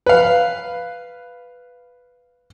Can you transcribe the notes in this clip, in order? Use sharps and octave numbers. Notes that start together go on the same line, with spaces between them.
B4 F5